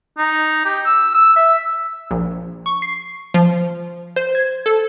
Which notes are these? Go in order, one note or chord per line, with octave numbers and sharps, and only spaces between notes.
D#4
G4
E6
E6
E5
A#1
C#6
C7
F3
C5
G#6
A4